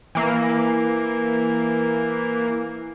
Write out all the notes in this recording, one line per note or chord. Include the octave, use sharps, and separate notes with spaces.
E3 A#3